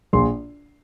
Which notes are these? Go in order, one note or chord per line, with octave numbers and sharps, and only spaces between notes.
A#1 C6